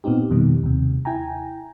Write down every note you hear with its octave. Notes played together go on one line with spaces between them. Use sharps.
A#2 B3 C4 D#4 G4
F2 B2 D#3 G3
D#2 C3
E4 G5 G#5 A#5